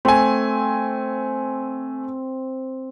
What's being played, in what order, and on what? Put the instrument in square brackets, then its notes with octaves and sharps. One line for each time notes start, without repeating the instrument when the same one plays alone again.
[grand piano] A3 G#5 [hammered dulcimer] C4